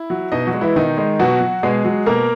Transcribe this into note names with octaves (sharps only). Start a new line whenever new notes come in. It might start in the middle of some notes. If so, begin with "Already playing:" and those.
Already playing: E4
F#3
B2 D#4 D#5
F#3 F#4
G#3
E3 E4
B2 D#3 D#4
G#3
B2 F#3 F#4
F#3
B2 G#3 G#4
F#3
B2 A#3 A#4